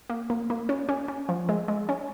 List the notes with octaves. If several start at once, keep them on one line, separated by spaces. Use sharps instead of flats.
A#3
A#3
A#3
C#4
C#4
C#4
F3
G#3
G#3
C#4